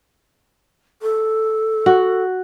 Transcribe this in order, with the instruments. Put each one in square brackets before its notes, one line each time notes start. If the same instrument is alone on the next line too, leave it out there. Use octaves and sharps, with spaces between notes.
[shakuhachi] A4
[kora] F#4